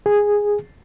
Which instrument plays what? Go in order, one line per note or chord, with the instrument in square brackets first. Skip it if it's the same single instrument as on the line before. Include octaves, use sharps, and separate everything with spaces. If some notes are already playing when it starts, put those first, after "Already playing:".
[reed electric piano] G#4